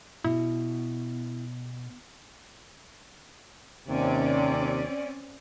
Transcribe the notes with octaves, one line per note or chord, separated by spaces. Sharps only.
B2 E4
D#2 C3 C4 C#4 D5